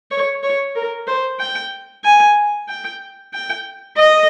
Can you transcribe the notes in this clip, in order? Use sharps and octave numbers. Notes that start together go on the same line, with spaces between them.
C#5
C#5
A#4
C5
G5
G#5
G5
G5
D#5